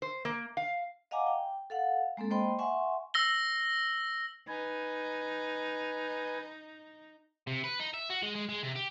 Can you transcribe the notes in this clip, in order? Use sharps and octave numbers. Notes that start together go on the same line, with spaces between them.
C5
A#3
F5
D#5 F5 F#5 G#5 A#5 D6
G5
A4 F5 F#5
G#3 A#3 C4 A4
A#3 C5 D#5 G5 B5 C6
E5 F#5 G#5 C6 C#6
E6 A#6 G7
D#4 B4 G#5
C3
B4
D#4
E5
F#4
G#3
G#3
G#3
C3
G4